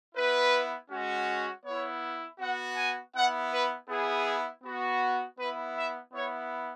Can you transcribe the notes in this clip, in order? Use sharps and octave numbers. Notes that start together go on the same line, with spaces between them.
B3 E4 B4
G#3 C#4 F#4
B3 E4 C#5
B3 F#4 F#5
G#5
B3 E4 F#5
B4
B3 E4 G#4
B3 F#4
B3 E4 B4
E5
B3 E4 C#5